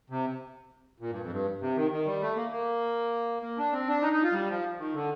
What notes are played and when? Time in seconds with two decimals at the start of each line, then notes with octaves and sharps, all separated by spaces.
0.10 C3
1.00 A#2
1.11 G2
1.21 F2
1.31 G2
1.61 C3
1.76 D#3
1.91 D#3
2.06 G3
2.22 A3
2.36 A#3
2.51 A#3
3.43 A#3
3.58 D4
3.72 C4
3.88 D4
4.02 D#4
4.13 D#4
4.23 F4
4.33 G3
4.49 F3
4.79 D#3
4.94 D3